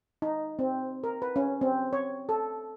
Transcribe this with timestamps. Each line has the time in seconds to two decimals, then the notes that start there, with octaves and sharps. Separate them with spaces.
0.22 D#4
0.59 C4
1.04 A#4
1.22 B4
1.36 C#4
1.61 C4
1.93 C#5
2.29 A4